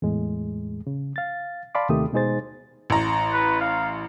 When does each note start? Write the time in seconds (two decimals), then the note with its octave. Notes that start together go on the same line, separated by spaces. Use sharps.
0.02 E2 A2 G#3
0.87 C#3
1.16 F5 A6
1.75 D5 F5 A5 B5 C6 D6
1.89 D#2 C3 D#3 A3 G4 D#6
2.13 B2 G#3 D#4 G#4 C5 A6
2.90 A1 A#5
3.33 B4
3.61 F5